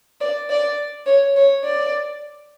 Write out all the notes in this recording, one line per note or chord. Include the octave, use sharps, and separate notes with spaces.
D5
D5
C#5
C#5
D5